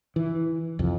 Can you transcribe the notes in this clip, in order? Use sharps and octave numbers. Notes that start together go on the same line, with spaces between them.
E3
C2 F2